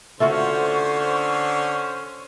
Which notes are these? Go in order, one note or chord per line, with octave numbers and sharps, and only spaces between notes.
D3 A3 C#4 F4 F#4 C5 C#6